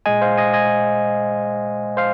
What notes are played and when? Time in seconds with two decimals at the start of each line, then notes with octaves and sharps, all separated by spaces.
0.06 A#2 G#3 D#5 G#5
0.22 C5 F5
0.37 D#5 G#5
0.53 D#5 G#5
1.97 C5 F5